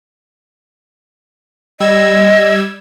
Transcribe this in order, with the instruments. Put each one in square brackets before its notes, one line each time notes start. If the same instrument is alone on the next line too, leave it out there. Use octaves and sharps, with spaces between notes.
[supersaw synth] G3 E6 G#6 [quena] D#5